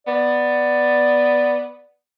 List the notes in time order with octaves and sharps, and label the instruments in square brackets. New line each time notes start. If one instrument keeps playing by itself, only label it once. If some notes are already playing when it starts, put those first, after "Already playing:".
[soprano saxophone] B3 [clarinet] D5